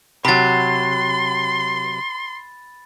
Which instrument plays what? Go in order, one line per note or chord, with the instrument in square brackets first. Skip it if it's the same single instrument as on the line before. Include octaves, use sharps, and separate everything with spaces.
[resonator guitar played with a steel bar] C3 F#3 [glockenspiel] B5 A6 [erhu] C6